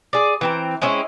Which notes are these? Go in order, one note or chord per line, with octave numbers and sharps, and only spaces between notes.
G#4 D5
E3 C4 A#5
G#3 C4 C#4 E4